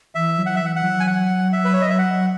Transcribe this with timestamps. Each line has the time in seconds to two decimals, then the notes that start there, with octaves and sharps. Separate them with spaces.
0.15 E3 E5
0.38 F#3
0.46 F#5
0.56 E5
0.61 E3 F#5
0.76 F#5
0.84 F#3
1.00 G#5
1.07 F#5
1.53 E5
1.65 B4
1.74 C#5
1.81 D#5
1.90 E5
1.99 F#5